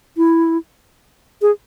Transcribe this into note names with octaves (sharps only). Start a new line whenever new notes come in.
E4
G#4